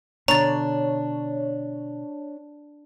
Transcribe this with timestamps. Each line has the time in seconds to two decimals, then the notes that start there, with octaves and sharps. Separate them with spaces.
0.28 B2 D3 D4 C#5 A#5 A6